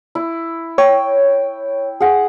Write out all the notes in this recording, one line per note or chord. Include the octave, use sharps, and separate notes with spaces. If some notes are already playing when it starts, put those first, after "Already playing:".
E4
C#5 G5
G#4 F#5